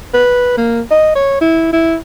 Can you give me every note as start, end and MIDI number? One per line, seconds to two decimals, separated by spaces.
0.14 0.55 71
0.57 0.81 58
0.91 1.12 75
1.15 1.40 73
1.41 1.68 64
1.73 1.96 64